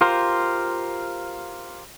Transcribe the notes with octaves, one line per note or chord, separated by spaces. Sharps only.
F4 G4 A#4 C5